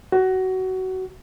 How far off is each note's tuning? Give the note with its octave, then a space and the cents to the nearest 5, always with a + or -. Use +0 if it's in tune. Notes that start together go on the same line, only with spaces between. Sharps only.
F#4 +20